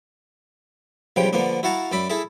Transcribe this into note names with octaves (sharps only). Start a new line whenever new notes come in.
B1 C#3 F3 G3 G5
D3 F3 A#3 B3 D4
E4 F#4 F5 F#5 A5 A#5
F#2 D5 E5 B5
E4 G#4 A4 E5